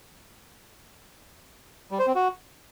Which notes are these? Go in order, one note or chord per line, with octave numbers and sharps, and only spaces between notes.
G3
C5
C4
F#4